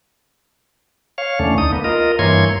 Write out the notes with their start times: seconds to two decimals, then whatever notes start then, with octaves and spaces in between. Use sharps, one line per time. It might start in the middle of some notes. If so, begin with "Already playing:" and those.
1.18 C#5 F5
1.39 E2 D3 A3 C#4
1.58 D2 D#4 D#6
1.73 A#3 B3
1.84 F4 A#4 D#5
2.19 G2 E3 A#3 C#5 C6 G#6